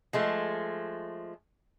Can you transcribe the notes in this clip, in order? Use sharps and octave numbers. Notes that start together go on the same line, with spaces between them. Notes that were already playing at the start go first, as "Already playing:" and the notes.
F3 G#3 A3